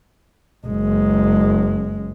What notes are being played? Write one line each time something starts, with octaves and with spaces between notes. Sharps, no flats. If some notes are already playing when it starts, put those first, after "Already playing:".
F#1 G#3